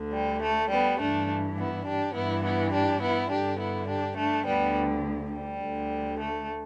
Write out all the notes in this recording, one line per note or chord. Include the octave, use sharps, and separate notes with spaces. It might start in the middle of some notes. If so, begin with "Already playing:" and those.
Already playing: D2 D3
G3
A3
G3 B3
G2 E3 A3 D4
B3 E4
D4 G4
G2 E3 B3 E4
B3 E4
D4 G4
B3 E4
G2 D3 D4 G4
B3 E4
D4 G4
A3 D4
D2 D3 G3 B3
G3
D2 D3
A3